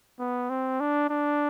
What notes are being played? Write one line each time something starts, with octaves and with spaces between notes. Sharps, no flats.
B3
C4
D4
D4